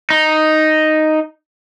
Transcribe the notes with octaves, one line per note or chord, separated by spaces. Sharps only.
D#4